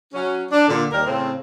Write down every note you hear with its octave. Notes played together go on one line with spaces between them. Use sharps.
F#3 C#4
D4
A#2 D3
D#2 G3 A#4
A2 C#3 C4